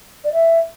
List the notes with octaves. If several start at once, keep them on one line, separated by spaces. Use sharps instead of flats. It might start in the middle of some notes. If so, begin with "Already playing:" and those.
D5
E5